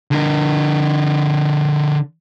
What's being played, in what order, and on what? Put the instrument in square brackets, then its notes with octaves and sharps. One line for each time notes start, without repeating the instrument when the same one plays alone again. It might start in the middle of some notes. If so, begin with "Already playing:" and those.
[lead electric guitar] D3 A#4